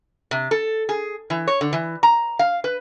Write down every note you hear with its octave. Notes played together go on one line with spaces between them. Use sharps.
C3
A4
G#4
E3
C#5
D3
E3
A#5
F5
B4